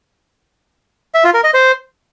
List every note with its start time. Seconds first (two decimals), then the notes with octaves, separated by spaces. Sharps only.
1.14 E5
1.24 F4
1.34 A#4
1.44 D#5
1.54 C5